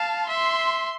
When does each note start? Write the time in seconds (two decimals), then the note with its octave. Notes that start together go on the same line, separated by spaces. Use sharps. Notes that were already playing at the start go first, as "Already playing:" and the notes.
Already playing: F5 A5
0.29 E5 C6